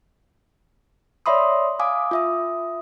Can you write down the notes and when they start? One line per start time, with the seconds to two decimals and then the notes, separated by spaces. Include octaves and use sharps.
1.26 C#5 D5 E5 B5 C6 D#6
1.79 F5 G#5 D6 D#6
2.11 F4 E5 D#6